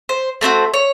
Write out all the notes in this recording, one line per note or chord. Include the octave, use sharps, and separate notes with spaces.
C5
A3 C4 D#4 F#4
C#5